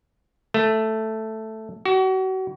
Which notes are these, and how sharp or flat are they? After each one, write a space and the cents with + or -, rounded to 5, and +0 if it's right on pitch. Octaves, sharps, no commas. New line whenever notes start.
A3 +0
F#4 +35